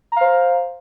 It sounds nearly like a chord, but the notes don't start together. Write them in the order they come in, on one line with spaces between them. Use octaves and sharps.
A#5 F5 C5